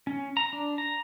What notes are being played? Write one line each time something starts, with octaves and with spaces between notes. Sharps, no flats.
C#4
A#5
D4
A#5